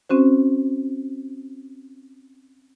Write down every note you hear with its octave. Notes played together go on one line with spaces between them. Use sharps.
C4 C#4 F#4 C5